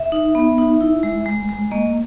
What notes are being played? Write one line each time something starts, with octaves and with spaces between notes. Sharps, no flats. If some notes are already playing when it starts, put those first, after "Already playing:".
Already playing: E5
D#4
B3
D#4
E4
G#3
G#3
G#3
A#3 D#5